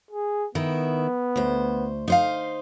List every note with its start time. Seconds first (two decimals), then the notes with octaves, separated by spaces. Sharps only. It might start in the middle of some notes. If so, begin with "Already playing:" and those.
0.11 G#4
0.55 D#3 B3 E4
1.36 D2 C5
2.08 D#4 C5 F5